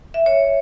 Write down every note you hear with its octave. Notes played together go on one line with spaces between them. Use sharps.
E5
C#5